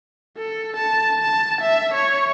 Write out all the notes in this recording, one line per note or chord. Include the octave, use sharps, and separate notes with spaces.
A4
A5
A5
E5
C#5